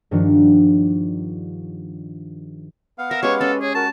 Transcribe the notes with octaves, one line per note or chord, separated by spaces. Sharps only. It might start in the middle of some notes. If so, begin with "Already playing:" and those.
G2 D#3 F3 D4 F#4
B3 F5
A#4 E5
G#3 C#4 G4 B4 C#5
C#4 A4
G#4 C#5
F#4 A#4 A5